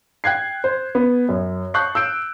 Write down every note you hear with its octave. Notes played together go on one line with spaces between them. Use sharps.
G5 F#6 G#6 C7
C5
B3
F#2
A5 C#6 F#6 G6 C7
E6 G6 D7